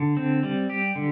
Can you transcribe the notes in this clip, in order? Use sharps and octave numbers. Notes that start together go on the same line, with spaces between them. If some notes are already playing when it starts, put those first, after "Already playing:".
Already playing: D3
C4
G3
G4
D3